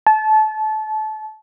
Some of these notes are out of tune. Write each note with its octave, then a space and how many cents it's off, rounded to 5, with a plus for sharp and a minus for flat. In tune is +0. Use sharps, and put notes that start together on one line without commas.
A5 -25